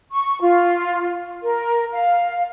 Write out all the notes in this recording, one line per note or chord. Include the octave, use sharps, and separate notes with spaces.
C#6
F4
A#4
F5